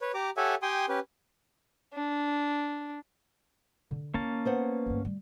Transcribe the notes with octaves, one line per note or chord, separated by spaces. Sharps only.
B4 C#5
G4 A#5 D6
G4 A4 C#5 E5 F#5 G#5
G4 G5 G#5 C6 D#6
C#4 G4 B4
D4
D3
A#3 C#4 E4 A5
B3 C5 F#5
D2 G2
G3